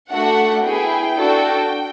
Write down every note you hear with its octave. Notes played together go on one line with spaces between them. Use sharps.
A3 D4 F#4 A4 F#5
B3 E4 G#4 G5
D4 F#4 A4